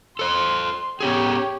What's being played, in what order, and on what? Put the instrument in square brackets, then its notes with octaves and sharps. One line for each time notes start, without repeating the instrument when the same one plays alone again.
[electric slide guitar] A4 C5 [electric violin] C6
[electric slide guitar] B3 C#4 G#4 [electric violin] G4 C#5